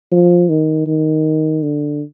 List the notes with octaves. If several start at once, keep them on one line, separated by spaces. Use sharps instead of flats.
F3
D#3
D#3
D3